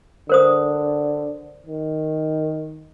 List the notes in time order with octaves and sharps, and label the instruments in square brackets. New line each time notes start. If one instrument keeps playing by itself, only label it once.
[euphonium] D3 [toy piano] A#4 C5 D#6
[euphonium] D#3